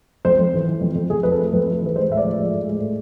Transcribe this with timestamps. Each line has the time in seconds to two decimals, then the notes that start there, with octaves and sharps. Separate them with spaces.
0.25 F2 C5
0.38 F2
0.54 E3
0.68 E3
0.81 F2
0.95 F2
1.10 F2 G#4
1.23 F2 B4
1.32 A4
1.39 A3
1.53 F2 B4
1.67 A3
1.81 E3
1.86 B4
1.95 G#3 C5
2.09 A2 E5
2.17 D5
2.24 F3
2.39 G#3
2.52 A2
2.68 G#3
2.81 A2